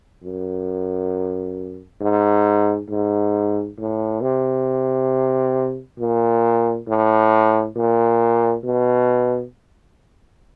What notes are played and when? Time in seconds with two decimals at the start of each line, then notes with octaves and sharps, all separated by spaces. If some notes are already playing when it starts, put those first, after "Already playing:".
0.23 F#2
2.01 G#2
2.89 G#2
3.78 A2
4.21 C3
6.00 A#2
6.88 A2
7.76 A#2
8.64 B2